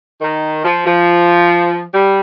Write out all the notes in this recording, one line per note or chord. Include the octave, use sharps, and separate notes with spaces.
D#3
F3
F3
G3